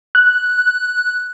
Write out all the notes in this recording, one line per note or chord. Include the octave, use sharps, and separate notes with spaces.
F#6